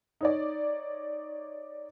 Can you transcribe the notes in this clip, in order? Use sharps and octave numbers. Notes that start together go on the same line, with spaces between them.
D#4 C#5 D5